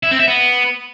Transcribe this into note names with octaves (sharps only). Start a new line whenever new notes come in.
E4
C4
E5
B3